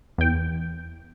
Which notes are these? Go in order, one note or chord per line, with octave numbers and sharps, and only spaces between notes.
E2 G5